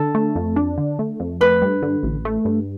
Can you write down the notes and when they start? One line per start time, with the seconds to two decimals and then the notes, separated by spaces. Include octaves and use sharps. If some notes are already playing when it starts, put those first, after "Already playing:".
Already playing: D3 A4
0.15 A3
0.36 F2
0.56 D4
0.78 D3
0.99 A3
1.20 F2
1.41 A3 B4
1.62 G2
1.82 D3
2.03 A1
2.25 A3
2.45 G2